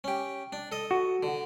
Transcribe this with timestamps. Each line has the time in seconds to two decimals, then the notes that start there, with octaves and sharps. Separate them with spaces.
0.04 C#4 G4
0.53 D4
0.72 A4 D#5
0.91 F#4
1.23 D3